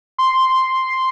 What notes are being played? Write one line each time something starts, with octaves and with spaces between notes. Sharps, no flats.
C6